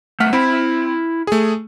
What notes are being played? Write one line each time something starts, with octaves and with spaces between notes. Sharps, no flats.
A3 B3 F#5 F6 B6
C4 E4 B5
A3 G#4